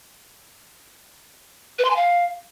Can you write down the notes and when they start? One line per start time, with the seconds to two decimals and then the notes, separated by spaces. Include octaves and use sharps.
1.79 B4
1.85 C6
1.90 G#5
1.96 F5